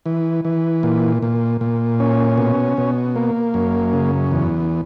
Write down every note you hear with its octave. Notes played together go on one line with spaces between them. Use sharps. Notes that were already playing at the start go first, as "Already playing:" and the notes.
E3
E3
A#2
A#2
A#2
C#4
B2
B2
A#3
F#2
C#3
E2